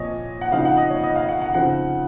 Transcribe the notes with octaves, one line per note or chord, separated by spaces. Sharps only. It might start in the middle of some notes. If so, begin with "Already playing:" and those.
Already playing: A#2 F3 C4 C#5 D#5
F#5
C#3 F3 C4 D#4 F5
F#5
D#5
C#5
D#5
F5
F#5
F#5
C#3 F3 C4 D#4 F#5